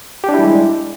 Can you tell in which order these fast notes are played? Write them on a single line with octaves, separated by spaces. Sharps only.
G4 D4 E4 G3 G#3